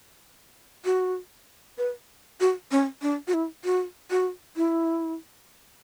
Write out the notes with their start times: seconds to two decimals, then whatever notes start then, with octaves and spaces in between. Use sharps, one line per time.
0.85 F#4
1.78 B4
2.41 F#4
2.71 C#4
3.02 D4
3.28 F#4
3.34 E4
3.65 F#4
4.11 F#4
4.57 E4